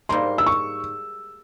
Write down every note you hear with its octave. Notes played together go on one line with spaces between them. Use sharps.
G#2 G3 A#3 C6
E6
C#6